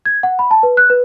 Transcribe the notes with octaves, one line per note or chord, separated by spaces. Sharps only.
G#6
F#5
B5
A5
B4
F#6
B4